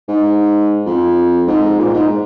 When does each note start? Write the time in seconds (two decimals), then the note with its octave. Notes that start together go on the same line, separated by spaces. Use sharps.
0.08 G#2
0.86 F2
1.47 G#2
1.79 A#2
1.94 G#2